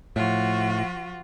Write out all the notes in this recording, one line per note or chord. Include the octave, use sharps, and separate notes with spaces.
A2 F3 F4 F#4